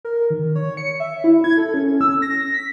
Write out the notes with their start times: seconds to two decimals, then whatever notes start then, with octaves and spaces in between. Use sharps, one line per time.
0.05 A#4
0.30 D#3
0.55 C#5
0.77 C#7
1.00 E5
1.24 E4
1.44 G#6
1.57 A4
1.74 C#4
2.01 E6
2.22 A#6
2.54 B6